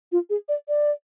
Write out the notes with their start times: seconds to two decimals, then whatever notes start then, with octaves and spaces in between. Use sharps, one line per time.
0.12 F4
0.30 G#4
0.49 D5
0.68 D5